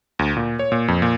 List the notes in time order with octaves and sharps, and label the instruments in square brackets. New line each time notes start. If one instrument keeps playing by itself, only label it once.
[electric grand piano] D2
A#2
C#5
A#2
F2
A#2